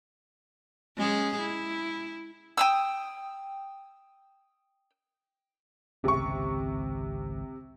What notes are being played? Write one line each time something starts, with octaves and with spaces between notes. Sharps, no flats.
G#3 C#4 G#4
E4
G5 D#6 E6
G#1 C#2 C3 C#4 C#6